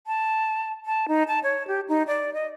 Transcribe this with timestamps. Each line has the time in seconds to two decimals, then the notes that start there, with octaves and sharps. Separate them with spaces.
0.07 A5
0.86 A5
1.08 D#4
1.28 A5
1.43 C#5
1.67 G4
1.89 D#4
2.07 D5
2.34 D#5